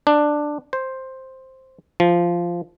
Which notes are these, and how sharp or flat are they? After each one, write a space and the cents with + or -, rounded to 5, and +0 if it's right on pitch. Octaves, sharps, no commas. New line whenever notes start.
D4 +10
C5 +5
F3 -10